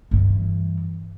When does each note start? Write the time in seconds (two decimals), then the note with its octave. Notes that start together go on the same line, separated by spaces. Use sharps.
0.11 G2 E3